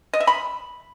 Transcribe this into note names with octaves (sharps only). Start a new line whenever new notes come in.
D#5
E5
B5